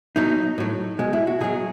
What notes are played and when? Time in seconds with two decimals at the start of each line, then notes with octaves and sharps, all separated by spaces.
0.16 B2 F#3 D#4
0.58 A2 F#3
0.99 B2 G#3
1.13 E4
1.27 F#4
1.41 B2 F#3 G#4